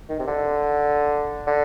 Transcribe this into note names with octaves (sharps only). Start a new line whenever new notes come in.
D#3
C3
D3
D3